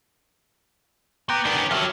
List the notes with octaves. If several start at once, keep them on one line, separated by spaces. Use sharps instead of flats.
B3 G5 A#5 D6
B2 D#3 B3 D4
C#4
F3 F#3 G4 A4 E5 F6